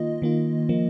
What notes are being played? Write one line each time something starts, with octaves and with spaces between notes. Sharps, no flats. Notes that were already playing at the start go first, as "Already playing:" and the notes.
Already playing: D#3 A#3 F4 D#5
D#3 A#3 F4
F3 A#3